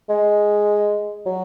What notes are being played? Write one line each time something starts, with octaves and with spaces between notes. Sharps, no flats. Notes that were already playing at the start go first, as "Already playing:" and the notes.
G#3
F#3